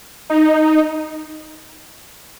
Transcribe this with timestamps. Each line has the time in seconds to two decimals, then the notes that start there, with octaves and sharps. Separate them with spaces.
0.30 D#4